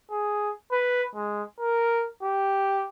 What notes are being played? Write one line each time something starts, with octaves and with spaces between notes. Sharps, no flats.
G#4
B4
G#3
A#4
G4